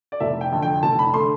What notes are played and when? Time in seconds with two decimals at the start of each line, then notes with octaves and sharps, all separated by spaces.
0.12 D5
0.20 F1 E5
0.41 G5
0.52 F2 D3 A3
0.62 G5
0.83 F1 A5
0.99 B5
1.14 D3 A3 C6